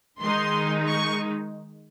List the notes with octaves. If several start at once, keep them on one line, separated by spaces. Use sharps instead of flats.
D#3 G#3 D#4 C6
C#6